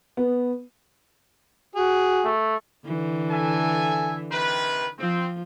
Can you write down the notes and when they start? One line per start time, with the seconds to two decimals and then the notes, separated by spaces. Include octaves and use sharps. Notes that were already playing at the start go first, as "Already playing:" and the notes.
0.17 B3
1.75 F#4 G#4
2.25 A3
2.86 D3 E3
3.30 A4 E5 G#5
4.32 C3 D#3 B4
4.99 F3 C4